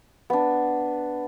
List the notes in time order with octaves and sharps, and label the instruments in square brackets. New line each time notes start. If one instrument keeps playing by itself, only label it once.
[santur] B3 D4